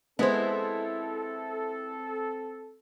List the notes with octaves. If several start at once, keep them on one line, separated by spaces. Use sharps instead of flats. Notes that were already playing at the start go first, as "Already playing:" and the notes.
G#3 B3 C4 E4 A4 C5